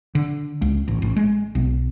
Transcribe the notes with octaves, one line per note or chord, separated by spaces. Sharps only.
D3
C#2
A1
A1
G#3
B1